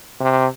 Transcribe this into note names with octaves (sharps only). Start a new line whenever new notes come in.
C3